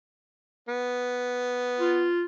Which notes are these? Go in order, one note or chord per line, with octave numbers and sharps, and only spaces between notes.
B3
F4